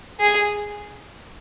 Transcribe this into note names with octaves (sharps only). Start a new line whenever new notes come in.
G#4